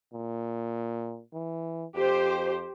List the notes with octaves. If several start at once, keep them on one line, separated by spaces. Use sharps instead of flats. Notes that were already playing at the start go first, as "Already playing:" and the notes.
A#2
E3
F2 G4 C5